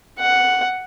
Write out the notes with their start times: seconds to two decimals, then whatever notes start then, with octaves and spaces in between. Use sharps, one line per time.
0.19 F#5